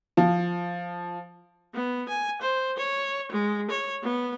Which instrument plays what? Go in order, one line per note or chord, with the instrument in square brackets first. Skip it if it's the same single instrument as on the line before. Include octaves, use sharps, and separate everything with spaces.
[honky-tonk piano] F3
[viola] B3
G#5
C5
C#5
G#3
C#5
B3